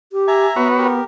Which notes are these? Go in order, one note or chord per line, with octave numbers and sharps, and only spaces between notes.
G4
E5 G#5 A#5
B3 F#4 B4 C#5
G4 A#4